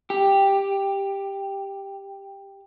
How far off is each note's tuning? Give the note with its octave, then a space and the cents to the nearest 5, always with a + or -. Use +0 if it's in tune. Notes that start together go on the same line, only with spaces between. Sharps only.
G4 +5